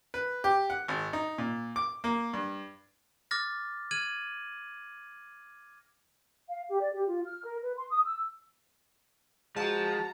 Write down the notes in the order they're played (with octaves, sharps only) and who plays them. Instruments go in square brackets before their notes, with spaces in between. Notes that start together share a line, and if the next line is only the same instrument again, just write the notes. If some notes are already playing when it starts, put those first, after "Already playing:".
[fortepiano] B4
G4
F#5
G#1
D#4
A#2
D6
A#3
G2
[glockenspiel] D6 F6 A6 A#6
F6 G#6 D#7 F#7
[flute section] F5
G4
D5
G4
F4
F6
A#4
B4
C6
D#6
E6
[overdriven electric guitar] F3 [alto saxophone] G#3 [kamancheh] F#4 A#5 [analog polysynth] A5